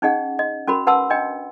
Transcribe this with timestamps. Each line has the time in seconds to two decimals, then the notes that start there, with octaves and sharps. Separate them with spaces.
0.02 C#4 D#4 G#4 D#5 F#5
0.39 D#5
0.67 C#4 F#4 A#4 B5
0.87 B4 F#5 A5 C6 E6
1.10 D4 D#5 G5